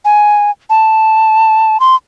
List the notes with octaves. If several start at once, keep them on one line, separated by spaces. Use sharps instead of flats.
G#5
A5
C6